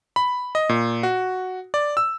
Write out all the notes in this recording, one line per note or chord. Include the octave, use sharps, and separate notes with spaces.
B5
D#5
A#2
F#4
D5
E6